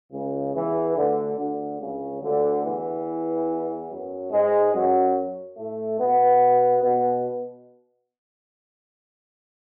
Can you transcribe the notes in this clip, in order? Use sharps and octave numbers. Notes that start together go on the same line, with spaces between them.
C#2 C#3
E2 E3
D2 D3
D2 D3
C#2 C#3
D2 D3
E2 E3
F#2 F#3
G#2 G#3
F#2 F#3
A2 A3
B2 B3
B2 B3